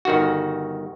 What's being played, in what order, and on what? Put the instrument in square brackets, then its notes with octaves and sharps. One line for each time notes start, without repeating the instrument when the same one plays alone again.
[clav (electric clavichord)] G1 D#3 F#4